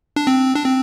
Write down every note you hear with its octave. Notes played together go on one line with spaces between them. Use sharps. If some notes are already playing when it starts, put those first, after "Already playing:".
D4
C4
D4
C4